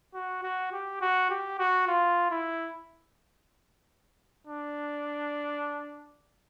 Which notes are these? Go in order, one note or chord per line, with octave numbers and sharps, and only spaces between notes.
F#4
F#4
G4
F#4
G4
F#4
F4
E4
D4